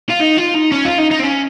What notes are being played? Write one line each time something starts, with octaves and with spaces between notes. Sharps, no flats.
F4
D#4
F4
D#4
C#4
F4
D#4
D#4
C4
C#4